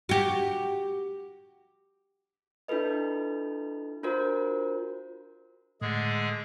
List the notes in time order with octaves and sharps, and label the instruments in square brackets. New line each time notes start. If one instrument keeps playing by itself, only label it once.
[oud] F#4 G4
[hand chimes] D4 E4 F4 A4 B4 D#5
D4 F4 F#4 A#4 C5
[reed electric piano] A2 [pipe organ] D3 G#3 G#4